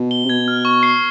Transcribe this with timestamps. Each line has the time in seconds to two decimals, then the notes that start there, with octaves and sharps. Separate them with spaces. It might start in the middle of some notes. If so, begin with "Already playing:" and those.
Already playing: B2
0.11 G7
0.24 C3
0.29 B2 G#6
0.48 F6
0.65 C#6
0.83 C7